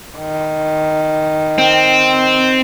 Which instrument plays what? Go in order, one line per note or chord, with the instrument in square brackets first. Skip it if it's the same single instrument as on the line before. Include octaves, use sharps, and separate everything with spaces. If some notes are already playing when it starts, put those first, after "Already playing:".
[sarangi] D#3
[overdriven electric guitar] C4